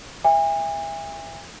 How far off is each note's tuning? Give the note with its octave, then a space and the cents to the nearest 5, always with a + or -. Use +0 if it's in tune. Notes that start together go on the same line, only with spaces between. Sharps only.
E5 +0 G#5 -40